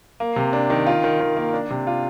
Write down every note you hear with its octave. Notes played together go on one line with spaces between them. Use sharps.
A#3
C3
D4
D#3
F4
D#3
D#3
A#3
D4
C3
F4